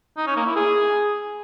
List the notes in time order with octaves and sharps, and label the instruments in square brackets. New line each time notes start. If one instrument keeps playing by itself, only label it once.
[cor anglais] D#4
C#4
A#3
E4
G#4